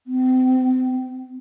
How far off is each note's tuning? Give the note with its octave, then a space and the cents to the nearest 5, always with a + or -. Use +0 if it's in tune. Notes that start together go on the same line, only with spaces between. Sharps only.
C4 -35